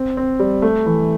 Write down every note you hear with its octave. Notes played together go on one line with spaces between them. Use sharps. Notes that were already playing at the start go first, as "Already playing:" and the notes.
Already playing: C4
C4
G3
A3
E3